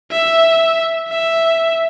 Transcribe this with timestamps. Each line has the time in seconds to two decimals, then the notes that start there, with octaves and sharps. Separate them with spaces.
0.11 E5
1.09 E5